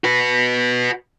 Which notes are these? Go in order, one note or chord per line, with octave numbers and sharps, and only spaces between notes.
F#4 B4